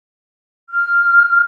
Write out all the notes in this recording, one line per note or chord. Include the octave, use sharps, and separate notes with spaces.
F6